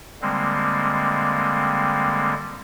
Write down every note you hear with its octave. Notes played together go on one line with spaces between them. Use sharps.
D3 G3 G#3 A#3 C4